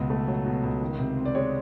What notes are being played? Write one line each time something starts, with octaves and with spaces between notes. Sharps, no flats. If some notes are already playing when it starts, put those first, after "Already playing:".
Already playing: C#2 B2
A3
F#3
B2
C#2
D#3
C3
C4
D5
G#3 C#5